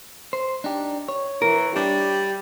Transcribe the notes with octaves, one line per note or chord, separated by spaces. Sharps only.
C5
D4 D#4 G4
C#5
E3 A#4
G3 D4 G4